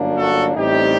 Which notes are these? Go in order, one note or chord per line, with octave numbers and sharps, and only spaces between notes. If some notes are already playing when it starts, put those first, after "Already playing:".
Already playing: G1 F#2 F#3 A#3 D4
F#4 A4
A1 A2 G3 C4 D#4 G4